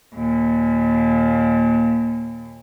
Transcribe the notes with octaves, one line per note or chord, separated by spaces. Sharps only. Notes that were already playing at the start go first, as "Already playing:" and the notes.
D#2 A#2